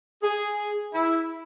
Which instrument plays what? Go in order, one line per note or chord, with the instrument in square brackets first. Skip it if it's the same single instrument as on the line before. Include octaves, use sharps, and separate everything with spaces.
[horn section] G#4
E4